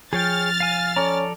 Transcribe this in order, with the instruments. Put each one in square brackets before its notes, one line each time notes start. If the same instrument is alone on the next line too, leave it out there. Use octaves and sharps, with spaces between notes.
[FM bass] F3 [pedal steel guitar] G#4 C#5 G5 [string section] F6 A6
[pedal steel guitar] F5 G#5
[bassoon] C#4 [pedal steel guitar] A4 D5 A#5